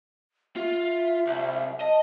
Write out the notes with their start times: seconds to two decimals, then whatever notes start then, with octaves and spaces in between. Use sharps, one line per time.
0.56 F4 E5
1.27 C2
1.81 D#5 A5